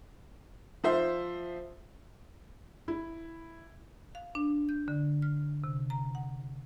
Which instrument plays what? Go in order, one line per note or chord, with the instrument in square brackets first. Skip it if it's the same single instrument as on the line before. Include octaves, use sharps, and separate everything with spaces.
[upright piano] F3 C5 E5
[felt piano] E4
[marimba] F5
D4
G6
D3
F6
C3
A#5
F#5